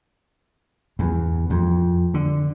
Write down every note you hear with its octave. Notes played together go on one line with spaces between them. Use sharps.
E2
F2
D3